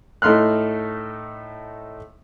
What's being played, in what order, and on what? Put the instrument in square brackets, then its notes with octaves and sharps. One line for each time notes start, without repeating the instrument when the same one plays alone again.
[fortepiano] A2 A3 D#4 C6 F6 F#6